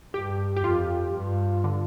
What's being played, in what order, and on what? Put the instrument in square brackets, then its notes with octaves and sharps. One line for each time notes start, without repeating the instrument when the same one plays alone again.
[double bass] G2 [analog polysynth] G4
[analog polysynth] G4
[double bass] F2 [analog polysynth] F4
[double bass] G2
[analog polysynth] D3